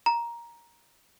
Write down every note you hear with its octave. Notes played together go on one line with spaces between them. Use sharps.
A#5